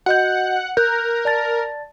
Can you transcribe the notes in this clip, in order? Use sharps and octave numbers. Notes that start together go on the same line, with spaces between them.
F#4 D#5 F#5 G6
A#4 F#6 G6
D5 A5 A6